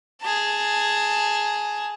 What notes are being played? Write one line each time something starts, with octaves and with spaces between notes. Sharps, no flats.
G#4 A5